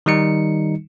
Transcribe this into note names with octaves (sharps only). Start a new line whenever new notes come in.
D#3 G3 D#4 C#7